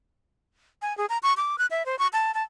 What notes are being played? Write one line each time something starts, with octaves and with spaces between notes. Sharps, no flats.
G#5
G#4
A#5
C#6
D6
F#6
E5
C5
C#6
A5
A5